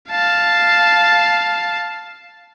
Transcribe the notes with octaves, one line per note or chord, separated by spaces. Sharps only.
F5 A5